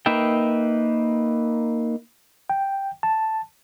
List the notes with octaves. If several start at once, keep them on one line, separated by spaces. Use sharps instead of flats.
A#3 D#4 B4 E5 G5
G5
A5